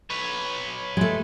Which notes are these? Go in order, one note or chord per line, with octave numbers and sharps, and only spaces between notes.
B4 C#5
G#3 A3